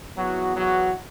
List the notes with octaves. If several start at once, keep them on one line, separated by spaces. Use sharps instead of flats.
E2 E3 F#3 B3 F#4
F#3 F#4